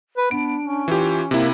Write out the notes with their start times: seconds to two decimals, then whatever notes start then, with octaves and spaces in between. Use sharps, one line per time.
0.17 B4
0.31 B3 D4 D7
0.61 C#4
0.88 E3 F4 G4
1.31 C3 A#3 E4